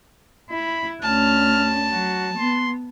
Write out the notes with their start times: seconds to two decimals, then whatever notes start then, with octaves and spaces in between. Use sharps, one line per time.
0.50 E4 B5
1.02 D2 C#4 A5 F6
1.92 F#3 F#4
2.37 B3 C6